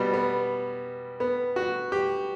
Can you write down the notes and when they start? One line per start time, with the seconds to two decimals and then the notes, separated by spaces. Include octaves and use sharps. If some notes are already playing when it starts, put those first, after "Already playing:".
Already playing: B2 G3 B3
0.14 B3
1.20 B3
1.56 F#4
1.92 G4